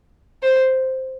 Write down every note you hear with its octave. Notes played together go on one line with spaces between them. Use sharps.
C5